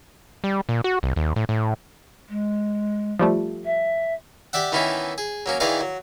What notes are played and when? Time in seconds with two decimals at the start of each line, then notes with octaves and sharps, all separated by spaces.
0.44 G3
0.69 A#2
0.84 F#4
1.03 C2
1.16 D#2
1.36 A2
1.49 A2
2.29 G#3
3.19 F3 G3 A3
3.65 E5
4.53 G4 D5 E5 F#5
4.72 D#3 E3 B3 C#4 D#4 E4
5.18 G#4
5.46 F#3 A#3 C#4
5.60 D#3 E3 G#4 D5 F5 A#5
5.81 F#3